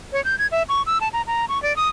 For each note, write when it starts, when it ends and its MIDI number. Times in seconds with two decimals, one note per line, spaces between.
0.13 0.23 73
0.25 0.38 91
0.39 0.47 92
0.52 0.63 76
0.69 0.82 85
0.87 0.98 88
1.01 1.09 81
1.13 1.22 82
1.27 1.45 82
1.49 1.61 85
1.63 1.75 74
1.76 1.89 87